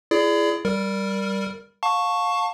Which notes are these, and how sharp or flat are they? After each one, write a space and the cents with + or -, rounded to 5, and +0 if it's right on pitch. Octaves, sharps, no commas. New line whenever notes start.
E4 +35 G#4 +10 D5 +0
G3 -5 A#4 +0
F5 +25 A5 +10 C#6 +0